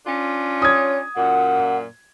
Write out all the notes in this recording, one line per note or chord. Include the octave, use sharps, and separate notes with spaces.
C#4 D4 F4
C#5 D#6 G#6
F#2 A#2 F#5